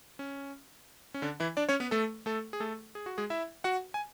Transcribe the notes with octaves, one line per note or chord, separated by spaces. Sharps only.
C#4
C#4
D3 D4
E3 E4
D4 D5
C#4 C#5
B3 B4
A3 A4
A3 A4
G#4
A3 A4
G#4
F#4
G#3 G#4
E4 E5
F#4 F#5
G#5